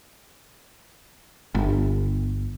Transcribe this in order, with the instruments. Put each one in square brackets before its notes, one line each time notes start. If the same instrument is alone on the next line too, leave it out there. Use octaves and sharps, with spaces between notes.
[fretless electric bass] G1